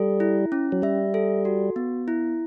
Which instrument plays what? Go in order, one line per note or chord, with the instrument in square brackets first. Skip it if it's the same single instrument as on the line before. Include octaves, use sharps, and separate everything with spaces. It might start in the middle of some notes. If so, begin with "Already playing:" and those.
Already playing: [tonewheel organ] G3 [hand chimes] A4
[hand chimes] E4
C#4
[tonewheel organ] F#3
[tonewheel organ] G3 [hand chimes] E5
[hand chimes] A4
F#4
B3
E4